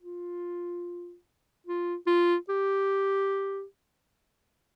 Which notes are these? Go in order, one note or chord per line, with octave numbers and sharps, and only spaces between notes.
F4
F4
F4
G4